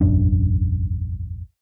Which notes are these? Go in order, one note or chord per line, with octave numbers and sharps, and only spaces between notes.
E1 A1 F#2 D4